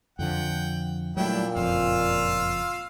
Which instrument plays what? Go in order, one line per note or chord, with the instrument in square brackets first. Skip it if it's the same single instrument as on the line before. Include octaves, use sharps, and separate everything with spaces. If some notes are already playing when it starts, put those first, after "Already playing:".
[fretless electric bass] F2 D3 F3 [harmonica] F#5 G5
[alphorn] A#2 [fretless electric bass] F#3 G3 A3 [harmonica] D4 E4 G5
[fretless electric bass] F#1 F2 [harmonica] F4 F5 E6